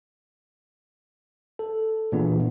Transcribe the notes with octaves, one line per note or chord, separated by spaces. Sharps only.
A4
A#2 E3 B3 D4 G#4